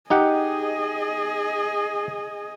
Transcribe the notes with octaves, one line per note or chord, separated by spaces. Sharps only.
D#4 G4 G#4 D#5 F#5